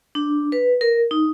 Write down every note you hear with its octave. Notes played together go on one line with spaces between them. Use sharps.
D4
B4
A#4
D#4